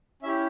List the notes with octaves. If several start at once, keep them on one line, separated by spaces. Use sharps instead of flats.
C#4 E4 G4 E5